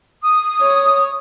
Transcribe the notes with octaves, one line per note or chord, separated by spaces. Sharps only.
D#6
C#5